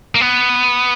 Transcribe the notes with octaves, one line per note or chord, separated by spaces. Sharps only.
A#3
B3